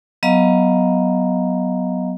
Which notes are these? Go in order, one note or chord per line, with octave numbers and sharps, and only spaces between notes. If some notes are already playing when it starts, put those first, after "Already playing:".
F#3 B3 D#5 F5 A#5